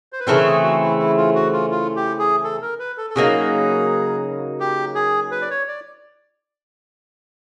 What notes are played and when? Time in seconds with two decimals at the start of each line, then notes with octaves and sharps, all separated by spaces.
0.13 C5
0.20 B4
0.27 C#3 E3 A3 C4 A#4
0.45 G#4
0.63 F#4
0.81 E4
0.99 E4
1.18 F4
1.35 F#4
1.53 F4
1.71 F4
1.96 G4
2.19 G#4
2.44 A4
2.62 A#4
2.79 B4
2.97 A4
3.10 A4
3.15 C#3 F#3 A#3 D#4 G#4
4.60 G4
4.95 G#4
5.31 B4
5.42 D5
5.50 C#5
5.68 D5